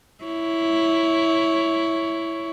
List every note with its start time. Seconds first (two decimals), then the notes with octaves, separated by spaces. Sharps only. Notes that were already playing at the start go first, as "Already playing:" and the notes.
0.24 E4 C#5